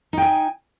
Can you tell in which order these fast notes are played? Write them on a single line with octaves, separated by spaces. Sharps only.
D#4 G5 G#5